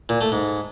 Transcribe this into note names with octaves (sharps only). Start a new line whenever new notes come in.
A#2
A3
G#2